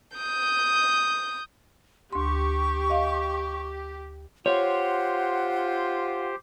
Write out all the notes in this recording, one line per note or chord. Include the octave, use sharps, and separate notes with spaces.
D#6 G6
D2 G4 C6 C#6
D#5 F5
F4 G4 C5 C#5 F#5